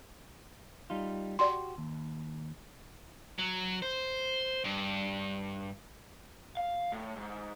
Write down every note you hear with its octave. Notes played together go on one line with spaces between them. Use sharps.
G3 D#4 F4
F#4 G4 D5 C6
D#2
F#3
C5
G2
F5
A2
G#2